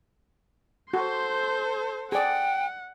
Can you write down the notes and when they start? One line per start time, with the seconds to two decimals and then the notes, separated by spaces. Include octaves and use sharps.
0.94 F#4 A4 C5 C6 G6
2.12 G#4 D5 F#5 G5